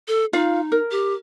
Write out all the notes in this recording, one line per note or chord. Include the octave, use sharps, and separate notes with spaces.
A4
D#4 F4 F5
A#4
G4